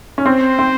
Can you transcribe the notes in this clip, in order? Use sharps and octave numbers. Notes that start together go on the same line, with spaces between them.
C#4
C4 C5
C4